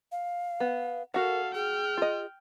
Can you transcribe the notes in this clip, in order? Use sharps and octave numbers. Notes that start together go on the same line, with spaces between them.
F5
B3
F#4 A4 A#4 F5 F#5
G#4 G5 F6
F4 D#5